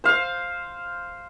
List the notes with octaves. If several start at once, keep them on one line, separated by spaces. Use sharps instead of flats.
C5 F5